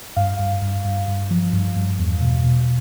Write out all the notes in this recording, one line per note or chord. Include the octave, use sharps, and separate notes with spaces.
G2 F5
G2
G2
G2
G2
F3
G2
G2
E2
B2
B2